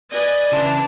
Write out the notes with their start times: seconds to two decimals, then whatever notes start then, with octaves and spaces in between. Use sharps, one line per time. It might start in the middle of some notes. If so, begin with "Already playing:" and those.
0.11 B4 D5 D#5 G#5
0.52 C#3 E3 D4 E4 C5 A5